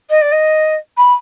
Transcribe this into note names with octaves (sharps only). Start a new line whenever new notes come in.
D#5
D5
D#5
B5